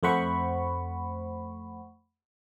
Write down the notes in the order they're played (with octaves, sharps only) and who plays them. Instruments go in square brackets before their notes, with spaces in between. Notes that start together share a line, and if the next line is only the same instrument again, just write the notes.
[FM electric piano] F2 A3 C5 F#5 B5 C#6